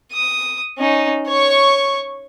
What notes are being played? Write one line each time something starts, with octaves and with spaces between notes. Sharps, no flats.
D#6
C#4 D#4
C#5 C#6